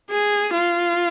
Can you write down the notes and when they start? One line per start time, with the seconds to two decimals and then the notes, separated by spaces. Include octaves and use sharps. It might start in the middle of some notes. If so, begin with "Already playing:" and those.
0.10 G#4
0.54 F4